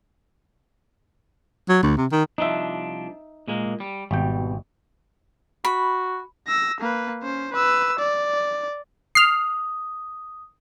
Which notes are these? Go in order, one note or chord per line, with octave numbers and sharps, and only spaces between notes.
F#3
D2
C3
D#3
C2 F3 D4 D#4 E5
A#2 G#3 A#3
G3
G#1 B2 G3 G5
F#4 B5
E6 A#6
A#3 B4
C#4 C5
B4 E6
D5
D#6 F6 C7